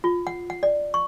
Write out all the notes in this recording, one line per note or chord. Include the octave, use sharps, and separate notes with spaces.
F4
F#5
F#5
D5
C#6